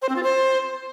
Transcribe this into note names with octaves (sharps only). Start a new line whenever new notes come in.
C5
C4
F4
C5